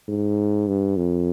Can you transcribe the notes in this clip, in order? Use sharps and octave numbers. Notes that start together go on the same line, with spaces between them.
G#2
G2
F2